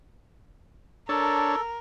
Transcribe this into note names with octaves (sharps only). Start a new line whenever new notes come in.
D4 A4 A#4 C#5 A5